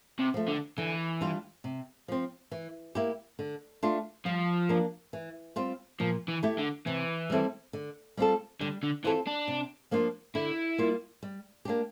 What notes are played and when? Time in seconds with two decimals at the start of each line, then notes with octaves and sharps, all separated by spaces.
0.19 C3
0.34 F3 A3
0.48 D3
0.78 D3 E3
1.21 G3 D4 F4
1.64 C3
2.08 F3 C4
2.51 E3
2.95 A#3 E4 G4
3.39 D3
3.83 A3 D4 F4
4.25 F3 G3
4.69 A#3 D4
5.13 E3
5.56 G3 C4 F4
6.00 A#2 F3
6.28 E3
6.43 A3 E4 G4
6.58 D3
6.87 C3 E3
7.30 G3 C4 E4 A4
7.73 D3
8.17 G3 C4 F4 A4
8.61 D3 G3
8.83 D3
9.04 E3 C4 F4 A4
9.27 D4
9.48 C3
9.91 F3 A#3 D4 F4
10.35 D3 E4
10.78 G3 A#3 F4
11.23 G3
11.65 A#3 D4 G4